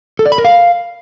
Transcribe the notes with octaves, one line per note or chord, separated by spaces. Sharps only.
A4
D5
B5
A#4
F5